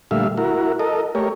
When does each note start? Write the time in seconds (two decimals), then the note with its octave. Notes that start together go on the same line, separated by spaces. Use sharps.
0.11 A#2 D3 G3 A3 E5 F5
0.37 E4 F#4 A#4
0.79 A4 A#4 D#5
1.15 A3 G4 A#4 C#5